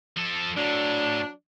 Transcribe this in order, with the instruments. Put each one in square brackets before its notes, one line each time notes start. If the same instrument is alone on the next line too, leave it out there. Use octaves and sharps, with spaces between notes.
[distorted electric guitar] F3 A4
[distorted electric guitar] A2 [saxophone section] F#3 D4